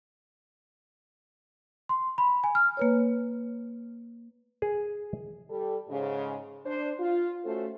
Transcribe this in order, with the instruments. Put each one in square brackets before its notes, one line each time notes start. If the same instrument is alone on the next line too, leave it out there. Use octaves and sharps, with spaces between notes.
[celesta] C6
B5
G#5
F6
[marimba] A#3 B4 C#5
[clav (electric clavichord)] G#4
[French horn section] G3 A4
G#2 C#3
D4 C5
F4
A3 C#4 F#4 A4 C5